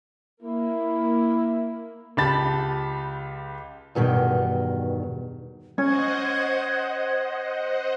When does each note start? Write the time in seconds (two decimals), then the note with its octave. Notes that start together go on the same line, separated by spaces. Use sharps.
0.43 A#3 E4
2.17 C#2 G4 A5 B5 A6
3.95 E2 G2 B2 D#3
5.78 C#4 C5 D#5 F#5 G#6